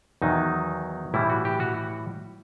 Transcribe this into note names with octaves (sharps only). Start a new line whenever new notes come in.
E2 D#3 F#3 D#4
A2 E3 G3 E4
F#4
G4
F#4